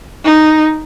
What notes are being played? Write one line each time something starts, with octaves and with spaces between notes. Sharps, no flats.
D#4